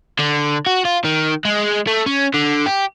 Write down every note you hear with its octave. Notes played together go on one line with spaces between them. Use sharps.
D3
F#4
F4
D#3
G#3
A3
C#4
D3
G4